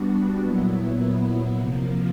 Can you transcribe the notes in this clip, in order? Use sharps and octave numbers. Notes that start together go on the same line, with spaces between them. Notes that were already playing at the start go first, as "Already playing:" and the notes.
Already playing: G3 B3 D4 F#4
A#2 F#3 B3 E4
C3 F3 A#3